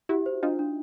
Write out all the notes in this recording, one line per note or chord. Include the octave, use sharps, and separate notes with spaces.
E4 F#4 G4
C5
D4 D#4 F4
D4